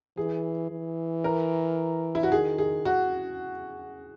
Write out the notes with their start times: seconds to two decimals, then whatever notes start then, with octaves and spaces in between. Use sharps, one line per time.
0.17 E3 G#4
0.70 E3
1.24 A#4
2.15 E4
2.23 F#4
2.32 D#3 G#4
2.58 G#4
2.85 F#4